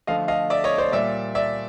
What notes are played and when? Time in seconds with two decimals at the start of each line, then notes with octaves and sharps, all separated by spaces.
0.07 D3 F3 A3 D#5 F5
0.28 D#5 F5
0.50 D5 E5
0.64 C#5 D#5
0.78 C5 D5
0.92 A#2 G3 D5 E5
1.35 D5 E5